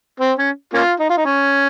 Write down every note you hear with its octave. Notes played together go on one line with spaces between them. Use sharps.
C4
C#4
A#3 C#4 F4
D#4
F4
D#4
C#4